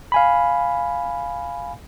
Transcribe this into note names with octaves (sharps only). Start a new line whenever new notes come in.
F5 G#5 B5